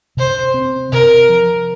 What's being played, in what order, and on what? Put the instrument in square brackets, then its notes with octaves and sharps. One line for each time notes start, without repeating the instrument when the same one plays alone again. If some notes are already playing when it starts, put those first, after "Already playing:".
[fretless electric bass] C3 [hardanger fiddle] C5
[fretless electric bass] C4
[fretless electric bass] C3 [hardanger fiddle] A#4
[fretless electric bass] F3